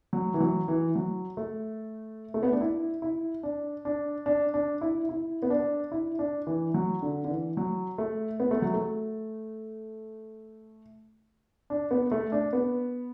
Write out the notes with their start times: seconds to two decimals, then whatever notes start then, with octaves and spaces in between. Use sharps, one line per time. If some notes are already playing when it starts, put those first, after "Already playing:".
0.13 F#3
0.34 E3
0.40 F#3
0.68 E3
0.95 F#3
1.37 A3
2.34 A3
2.43 B3
2.52 D4
2.61 E4
3.02 E4
3.43 D4
3.85 D4
4.26 D4
4.54 D4
4.81 E4
5.09 E4
5.43 B3
5.50 D4
5.92 E4
6.19 D4
6.47 E3
6.74 F#3
7.02 D3
7.25 D3
7.29 E3
7.57 F#3
7.98 A3
8.40 B3
8.51 A3
8.62 F#3
8.74 A3
11.70 D4
11.91 B3
12.11 A3
12.32 D4
12.53 B3